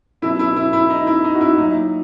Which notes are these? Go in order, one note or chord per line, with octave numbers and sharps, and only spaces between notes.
B2 F#3 E4
E4
E4
E4
D#4
E4
D#4
F#4
E4
A#2 F#3 D#4